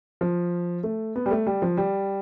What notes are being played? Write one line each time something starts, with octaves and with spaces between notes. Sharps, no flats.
F3
A3
B3
G3
A3
G3
F3
G3